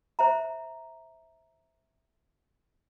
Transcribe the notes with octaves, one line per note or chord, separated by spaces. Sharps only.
C5 E5 A#5